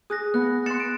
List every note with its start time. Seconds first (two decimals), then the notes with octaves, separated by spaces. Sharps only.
0.10 G#4 D#6 F#6 A#6
0.34 B3 F#6
0.66 C6 F#6 A6 C#7 E7
0.80 D7